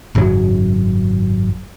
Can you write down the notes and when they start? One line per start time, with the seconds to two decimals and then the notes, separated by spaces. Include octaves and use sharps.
0.15 G#1 F#2 C#3 F#3